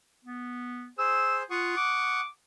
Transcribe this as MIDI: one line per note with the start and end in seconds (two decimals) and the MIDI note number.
0.25 0.88 59
0.98 1.43 68
0.98 1.43 72
0.98 1.38 88
1.50 1.73 65
1.50 2.21 78
1.50 2.21 85
1.50 2.21 87
1.77 2.28 86